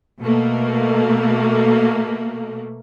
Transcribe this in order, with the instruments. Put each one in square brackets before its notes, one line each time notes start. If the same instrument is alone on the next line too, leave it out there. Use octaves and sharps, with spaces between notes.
[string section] B2 A3 A#3